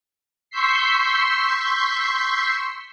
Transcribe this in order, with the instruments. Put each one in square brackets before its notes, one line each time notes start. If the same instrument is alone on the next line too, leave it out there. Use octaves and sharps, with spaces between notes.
[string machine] C6 C#6 E6 G6 B6 C7